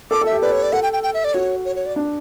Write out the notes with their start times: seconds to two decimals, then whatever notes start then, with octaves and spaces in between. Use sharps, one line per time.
0.11 A4 D6
0.21 A4 E5
0.32 G4
0.42 B4 D5
0.52 C#5
0.63 D5
0.73 A4 F#5
0.83 G5
0.93 G5
1.03 G5
1.14 E5
1.24 D5
1.34 F#4 C#5
1.65 C#5
1.76 C#5
1.86 D5
1.96 D4